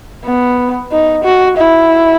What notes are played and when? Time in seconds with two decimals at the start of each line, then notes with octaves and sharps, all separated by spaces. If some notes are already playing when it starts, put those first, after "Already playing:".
0.25 B3
0.92 D#4
1.24 F#4
1.57 E4